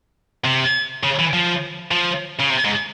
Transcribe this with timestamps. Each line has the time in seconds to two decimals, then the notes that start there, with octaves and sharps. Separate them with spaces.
0.45 C3
1.03 C#3
1.19 E3
1.33 F3
1.91 F3
2.40 C#3
2.50 C3
2.65 G#2